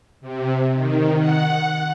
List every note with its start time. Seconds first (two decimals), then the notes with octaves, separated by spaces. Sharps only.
0.21 C3
0.74 D#3
1.19 F#5